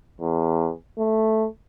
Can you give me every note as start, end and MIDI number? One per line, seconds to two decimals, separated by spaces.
0.21 0.70 40
0.98 1.47 57